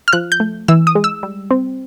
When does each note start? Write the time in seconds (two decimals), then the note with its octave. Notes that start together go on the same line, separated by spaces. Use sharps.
0.08 F6
0.13 F3 F#6
0.32 G6
0.40 A3
0.68 E3 E6
0.87 D#6
0.95 G#3
1.04 E6
1.23 G3
1.51 C4